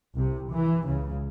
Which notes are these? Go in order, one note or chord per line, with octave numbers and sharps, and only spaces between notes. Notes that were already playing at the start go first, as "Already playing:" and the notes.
C2 C3
E3
C#2 C#3